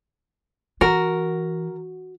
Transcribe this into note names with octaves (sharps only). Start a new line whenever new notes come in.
E3 F#4 A#4